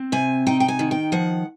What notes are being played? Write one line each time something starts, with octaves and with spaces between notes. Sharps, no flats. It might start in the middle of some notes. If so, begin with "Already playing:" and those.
Already playing: C4
C3 G#5
D#4 G5
G5
G#5
D#3
G5
F3 F#5